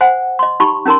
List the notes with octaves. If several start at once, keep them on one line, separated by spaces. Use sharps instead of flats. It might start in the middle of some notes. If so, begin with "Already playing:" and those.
C5 F#5 G#5
D#5 C6
D#4 G4 B5 C#6
C#4 D#4 A#4 A#5 C6